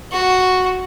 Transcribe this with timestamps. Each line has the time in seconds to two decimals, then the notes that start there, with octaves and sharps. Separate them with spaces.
0.11 F#4